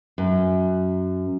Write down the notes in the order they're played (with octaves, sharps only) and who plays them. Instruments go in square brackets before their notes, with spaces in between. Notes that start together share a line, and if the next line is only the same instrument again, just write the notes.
[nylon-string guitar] F#2